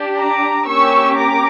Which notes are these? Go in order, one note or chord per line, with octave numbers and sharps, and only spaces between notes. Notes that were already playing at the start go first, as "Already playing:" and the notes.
Already playing: D4 G4
A#5 D6
A#3 C#4 G4 C#6 E6
A#5 D6